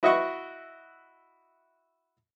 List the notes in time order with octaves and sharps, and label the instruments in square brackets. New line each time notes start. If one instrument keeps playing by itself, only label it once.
[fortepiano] E4 F#4 D#5 E5 F#5 C#6